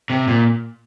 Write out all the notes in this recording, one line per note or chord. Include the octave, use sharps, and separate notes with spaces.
C3
A#2